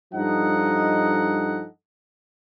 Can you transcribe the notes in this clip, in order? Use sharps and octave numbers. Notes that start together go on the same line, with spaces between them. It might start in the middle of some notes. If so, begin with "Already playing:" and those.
G2 F3 D#4 A4 D#5 F#5